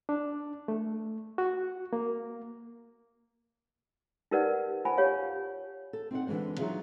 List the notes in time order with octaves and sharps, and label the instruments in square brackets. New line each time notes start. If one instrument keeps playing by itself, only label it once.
[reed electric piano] D4
A3
F#4
A#3
[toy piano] D#4 G4 A#4 B4 D5 F#5
F4 C5 F#5 G#5 A5 B5
G4 C#5 F5
[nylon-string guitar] A4
C4 D#4 E5 F#5
D3 E3 F#3 G#3 C5
F#3 D#4 F4 G#4 E5 F5